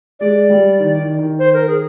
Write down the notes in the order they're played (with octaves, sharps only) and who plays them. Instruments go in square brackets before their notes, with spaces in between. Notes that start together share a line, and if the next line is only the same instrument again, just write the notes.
[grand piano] G#3 [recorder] D5
[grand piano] G3
D#3
D#3
D#3
[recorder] C5
A#4
G#4